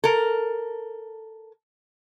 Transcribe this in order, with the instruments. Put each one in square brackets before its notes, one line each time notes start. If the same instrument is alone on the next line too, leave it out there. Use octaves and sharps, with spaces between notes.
[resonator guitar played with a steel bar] A4 A#4